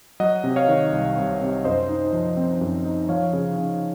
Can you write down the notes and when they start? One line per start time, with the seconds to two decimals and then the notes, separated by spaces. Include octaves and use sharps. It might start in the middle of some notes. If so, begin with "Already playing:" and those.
0.20 F#3 D#5 F#5
0.44 C3
0.56 C#5 F5
0.68 D#3
0.92 C2
1.17 C2
1.41 C3
1.64 F#2 C5 D#5
1.89 D#4
2.13 F3
2.37 C4
2.61 F#2
2.85 D#4
3.09 F3 C#5 F5
3.33 C#3
3.57 C#3